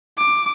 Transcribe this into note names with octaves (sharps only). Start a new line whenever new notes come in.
D6